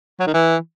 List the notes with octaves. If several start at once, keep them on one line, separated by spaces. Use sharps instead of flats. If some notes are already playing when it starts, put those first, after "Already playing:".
F#3
D#3
E3